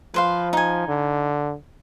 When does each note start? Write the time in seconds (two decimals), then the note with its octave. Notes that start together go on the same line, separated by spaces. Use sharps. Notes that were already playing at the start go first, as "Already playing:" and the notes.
0.14 F3 B4 C5 F5
0.53 D#4 G#5
0.88 D3